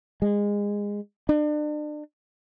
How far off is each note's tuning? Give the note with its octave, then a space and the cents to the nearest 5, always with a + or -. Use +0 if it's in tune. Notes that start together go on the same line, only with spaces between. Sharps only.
G#3 -20
D4 +35